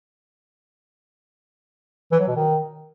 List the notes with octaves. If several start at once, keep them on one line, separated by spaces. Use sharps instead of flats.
E3
F#3
B2
D#3